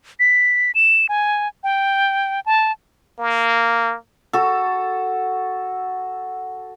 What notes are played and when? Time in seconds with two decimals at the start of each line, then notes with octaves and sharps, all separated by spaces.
0.20 B6
0.75 E7
1.09 G#5
1.64 G5
2.46 A5
3.19 A#3
4.33 F#4 A4